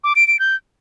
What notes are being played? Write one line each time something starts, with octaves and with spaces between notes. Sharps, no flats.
D6
D7
D7
G6